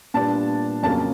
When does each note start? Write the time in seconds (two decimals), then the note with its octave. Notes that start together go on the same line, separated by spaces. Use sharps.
0.14 A#2 G3 B3 D4 A5
0.83 F2 C#3 F#3 A#3 C#4 A5